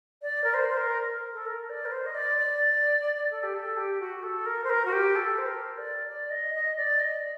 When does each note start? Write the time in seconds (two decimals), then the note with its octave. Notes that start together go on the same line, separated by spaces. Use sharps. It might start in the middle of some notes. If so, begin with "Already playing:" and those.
0.22 D5
0.44 A#4
0.54 C5
0.69 C5
0.77 A#4
1.33 A4
1.46 A#4
1.70 D5
1.85 A#4
1.92 C5
2.06 D#5
2.15 D5
2.38 D5
3.31 A4
3.43 G4
3.54 A4
3.77 G4
4.00 F#4
4.23 A4
4.46 A#4
4.64 C5
4.70 A#4
4.85 F#4
4.92 G4
5.16 A4
5.38 C5
5.47 A#4
5.78 D5
6.08 D5
6.30 D#5
6.54 D#5
6.77 D5
7.00 D#5